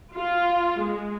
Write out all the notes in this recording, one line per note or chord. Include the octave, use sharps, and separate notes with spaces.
F4
G#3